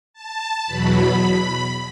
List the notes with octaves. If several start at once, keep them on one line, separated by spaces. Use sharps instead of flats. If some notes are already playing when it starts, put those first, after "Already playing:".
A5
E2 B2 F#3 B5